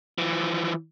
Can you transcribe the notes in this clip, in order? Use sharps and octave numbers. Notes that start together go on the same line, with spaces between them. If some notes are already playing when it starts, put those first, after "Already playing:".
E3 F3